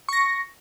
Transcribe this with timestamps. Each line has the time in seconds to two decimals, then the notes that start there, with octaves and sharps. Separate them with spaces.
0.09 C#6
0.13 A#6
0.17 C#7